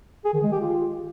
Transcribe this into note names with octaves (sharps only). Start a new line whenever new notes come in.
G#4
D#3
G#3
G4
F4